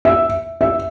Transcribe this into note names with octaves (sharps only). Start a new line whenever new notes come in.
E5
E5